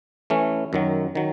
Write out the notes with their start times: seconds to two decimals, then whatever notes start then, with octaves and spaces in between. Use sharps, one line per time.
0.30 E3 A3 C#4
0.73 F#2 D#3 F#3
1.15 D#3 F#3